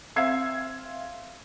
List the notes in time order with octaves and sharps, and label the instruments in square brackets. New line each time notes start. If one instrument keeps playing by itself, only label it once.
[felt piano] C4 E5 F5 E6 G#6 C7